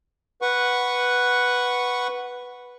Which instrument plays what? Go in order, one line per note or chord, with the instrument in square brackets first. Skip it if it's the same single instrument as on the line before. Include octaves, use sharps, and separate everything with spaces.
[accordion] B4 F#5 C#6